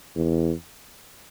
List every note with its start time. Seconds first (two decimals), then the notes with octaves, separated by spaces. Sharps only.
0.16 E2